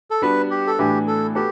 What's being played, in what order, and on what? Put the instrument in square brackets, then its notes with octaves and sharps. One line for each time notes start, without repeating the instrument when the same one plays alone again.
[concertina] A4
[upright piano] G3 B3 D4 F#4 [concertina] B4
[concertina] G4
A4
[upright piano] A2 E3 B3 D4 F#4 [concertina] G4
[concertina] A4
[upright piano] B3 F#4 A4 [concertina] G4